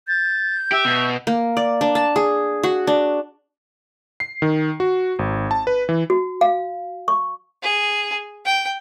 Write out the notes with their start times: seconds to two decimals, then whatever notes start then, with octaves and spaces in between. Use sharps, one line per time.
0.08 G6 A6
0.72 G4 E5
0.85 B2
1.27 A#3
1.57 D5
1.81 D4
1.95 A5
2.16 G#4
2.63 F#4
2.87 D4
4.20 C7
4.42 D#3
4.80 F#4
5.19 G#1
5.51 A5
5.67 B4
5.89 E3
6.10 F#4
6.41 F5
7.08 C#6
7.63 G#4
8.45 G5